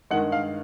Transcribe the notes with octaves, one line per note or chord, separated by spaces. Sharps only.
G2 D#3 G#3 F#5
F5